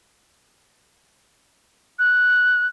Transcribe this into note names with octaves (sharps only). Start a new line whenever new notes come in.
F#6